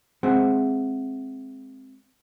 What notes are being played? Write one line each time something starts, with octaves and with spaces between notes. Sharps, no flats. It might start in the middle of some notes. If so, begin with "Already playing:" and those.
G#3 C4 G#4 C5 E5 F#5